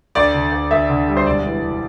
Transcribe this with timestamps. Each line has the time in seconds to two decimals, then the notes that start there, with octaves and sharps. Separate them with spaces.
0.15 D2 D5
0.34 D3
0.52 D2
0.71 D2 E5
0.90 D3
1.08 G3
1.17 C5
1.26 E1 D5
1.45 E3
1.63 E1